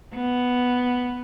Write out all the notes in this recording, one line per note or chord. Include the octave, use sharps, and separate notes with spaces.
B3